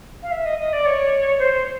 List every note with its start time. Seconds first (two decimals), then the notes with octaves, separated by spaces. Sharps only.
0.23 F5
0.31 E5
0.45 D#5
0.59 D#5
0.73 D5
0.86 C#5
1.39 C5